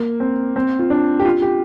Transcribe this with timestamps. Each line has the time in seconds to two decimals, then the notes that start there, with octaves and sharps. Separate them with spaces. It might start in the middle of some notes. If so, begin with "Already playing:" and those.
Already playing: A#3
0.20 C4
0.56 C4
0.79 F4
0.90 D4
1.19 G4
1.25 F4
1.42 G4